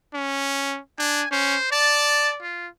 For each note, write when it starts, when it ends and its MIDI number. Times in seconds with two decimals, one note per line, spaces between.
0.14 0.79 61
0.99 1.24 62
0.99 1.29 80
1.31 1.56 61
1.31 1.69 72
1.72 2.42 74
1.72 2.30 81
2.42 2.68 65